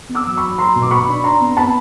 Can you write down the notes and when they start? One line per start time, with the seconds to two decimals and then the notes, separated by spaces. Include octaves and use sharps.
0.09 B3
0.15 D6 E6
0.27 F#3
0.37 B5 C#6
0.43 F#3
0.58 F#3 A#5 C6
0.76 B2
0.82 D6
0.91 B2 B5 C#6
1.08 D4
1.24 D4 A#5 C6
1.41 B3
1.57 B3 A5 B5